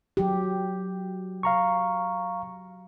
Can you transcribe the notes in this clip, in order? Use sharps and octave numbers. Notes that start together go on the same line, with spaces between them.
F#3 G4
F5 A#5 C#6